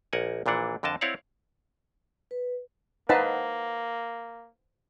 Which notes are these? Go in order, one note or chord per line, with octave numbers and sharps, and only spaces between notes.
A#1 A#4 F#5 G#5
A#1 A#2 E3 D4 F#5
F2 D3 A#4 D#5 A5
C4 E4 C#5 D5 F5 F#5
B4
A#3 D#4 B4 C5 F5 F#5 A5